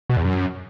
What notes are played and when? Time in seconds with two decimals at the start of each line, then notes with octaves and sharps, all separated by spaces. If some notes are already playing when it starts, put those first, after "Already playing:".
0.10 B2
0.17 E2
0.24 F#2